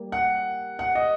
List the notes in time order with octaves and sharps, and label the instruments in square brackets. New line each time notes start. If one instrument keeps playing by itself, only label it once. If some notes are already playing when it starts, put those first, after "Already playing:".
Already playing: [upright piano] G3 A#3
[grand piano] F#5
F#5
D#5